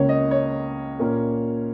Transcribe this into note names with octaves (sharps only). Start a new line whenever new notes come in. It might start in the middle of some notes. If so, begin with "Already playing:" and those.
Already playing: C#2 C#3 A#3 C#4 C#5
D#5
C#5
A#2 A#3 C#4